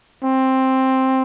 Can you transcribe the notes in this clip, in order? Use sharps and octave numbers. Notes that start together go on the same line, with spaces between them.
C4